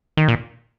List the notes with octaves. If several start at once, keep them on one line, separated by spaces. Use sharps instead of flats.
D#3
A#2